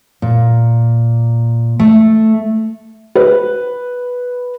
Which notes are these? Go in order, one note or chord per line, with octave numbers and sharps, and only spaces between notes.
A#2
A3
B4